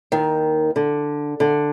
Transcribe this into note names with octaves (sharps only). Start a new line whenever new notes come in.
D#2 D#3
D3
D3